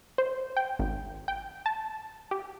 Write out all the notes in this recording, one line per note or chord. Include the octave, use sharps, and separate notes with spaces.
C5
G5
G#1
G5
A5
G4